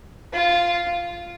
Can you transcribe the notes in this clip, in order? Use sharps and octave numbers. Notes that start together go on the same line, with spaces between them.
F4